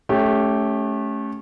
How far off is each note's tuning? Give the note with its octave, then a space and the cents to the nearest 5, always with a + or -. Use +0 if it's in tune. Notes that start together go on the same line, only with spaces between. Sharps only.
A3 -20 C#4 +0 G4 +0